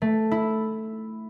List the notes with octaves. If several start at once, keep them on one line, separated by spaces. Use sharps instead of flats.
A3
E4